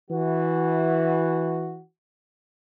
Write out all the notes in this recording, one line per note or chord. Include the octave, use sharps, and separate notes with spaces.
E3 F#4